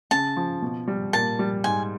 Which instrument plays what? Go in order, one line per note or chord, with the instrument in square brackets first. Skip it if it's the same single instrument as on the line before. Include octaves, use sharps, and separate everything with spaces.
[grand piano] C#3 [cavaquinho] A5
[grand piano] F3
B2
G3
[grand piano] A#2 [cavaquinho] A5
[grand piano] G3
[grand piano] G#2 [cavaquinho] G#5